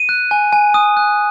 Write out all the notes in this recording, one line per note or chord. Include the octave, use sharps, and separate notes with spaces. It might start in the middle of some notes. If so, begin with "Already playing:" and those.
Already playing: D#7
F#6
G#5
G#5
D#6
F#6